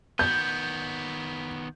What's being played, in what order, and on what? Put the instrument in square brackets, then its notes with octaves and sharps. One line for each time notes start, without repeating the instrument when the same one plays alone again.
[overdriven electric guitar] D#3 B3 [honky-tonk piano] G6